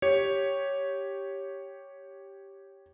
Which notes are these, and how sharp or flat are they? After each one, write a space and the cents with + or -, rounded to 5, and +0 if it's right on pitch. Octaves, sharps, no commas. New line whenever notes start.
G4 +0 C#5 +0